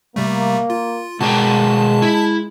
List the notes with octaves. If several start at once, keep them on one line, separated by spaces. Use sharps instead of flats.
C3 G3 A3 A#3
F4
B2 G#3 A#4 G5 A5
E4